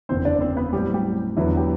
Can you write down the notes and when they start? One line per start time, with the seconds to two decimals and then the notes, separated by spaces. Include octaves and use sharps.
0.09 F#1 E2 D3 C4 C5
0.25 D4 D5
0.41 C4 C5
0.57 B3 B4
0.73 A2 F#3 G3 C4 G4
0.94 G3 G4
1.37 E2 D3 F#3 B3 E4
1.57 G4